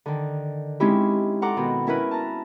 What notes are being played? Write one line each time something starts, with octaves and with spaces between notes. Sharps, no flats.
D3 D#3
G#3 C4 C#4 D#4 E4 G4
A4 F#5 A#5 C6 D6
B2 D#3
C#4 E4 A#4 B4
A5 A#5